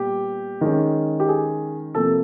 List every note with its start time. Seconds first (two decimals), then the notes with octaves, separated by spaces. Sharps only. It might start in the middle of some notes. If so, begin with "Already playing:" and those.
Already playing: A#2 G3 B3 G4
0.61 D#3 G#3 C#4
1.20 G4
1.28 G#4
1.95 C3 F3 A#3 A4